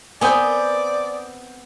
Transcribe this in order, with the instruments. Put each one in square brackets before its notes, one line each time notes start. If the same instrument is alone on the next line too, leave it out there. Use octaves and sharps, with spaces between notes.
[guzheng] B3 C4 [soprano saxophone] D5 [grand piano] G#5 D#6 G6